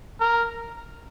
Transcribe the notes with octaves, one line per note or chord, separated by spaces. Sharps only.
A#4